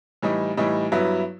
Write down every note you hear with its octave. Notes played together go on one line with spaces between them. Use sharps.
A2 E3 G3 D#4
A2 E3 G3 D#4
G2 F#3 B3 E4